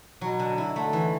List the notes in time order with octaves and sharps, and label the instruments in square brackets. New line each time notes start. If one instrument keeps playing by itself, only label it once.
[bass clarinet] B2 [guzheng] F#3
[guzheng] D3
E4
[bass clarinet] D3 [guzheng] A3
[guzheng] E3